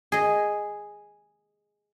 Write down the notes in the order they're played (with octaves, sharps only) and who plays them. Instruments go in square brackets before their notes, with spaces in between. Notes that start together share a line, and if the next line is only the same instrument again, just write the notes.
[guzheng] G#4 D#5